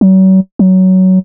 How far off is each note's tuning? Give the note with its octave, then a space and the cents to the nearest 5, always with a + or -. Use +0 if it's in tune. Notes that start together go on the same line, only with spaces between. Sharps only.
F#3 +40
F#3 +15